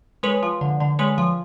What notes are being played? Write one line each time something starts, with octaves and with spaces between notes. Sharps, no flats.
G#3 B4 C#5
F3
D3
D3
G#3 B4 C#5
F3